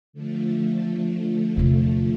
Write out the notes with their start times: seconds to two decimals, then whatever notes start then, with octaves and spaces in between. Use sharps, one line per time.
0.13 D3 F3 A3
1.57 E2 C3